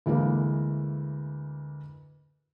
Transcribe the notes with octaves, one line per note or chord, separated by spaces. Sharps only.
D2 E3 G#3 A#3